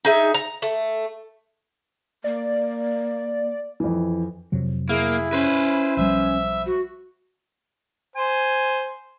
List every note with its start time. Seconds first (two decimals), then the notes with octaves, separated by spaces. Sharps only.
0.05 D#4 G#4 E5
0.34 A#5
0.62 A3
2.24 A#3 D5
3.80 F2 E3
4.52 F2 C3 F#3
4.89 A#3 E4 G#4
5.33 C#4 B4 C5
5.97 B1 F3 G3 E5
6.66 F#4
8.16 C5 G#5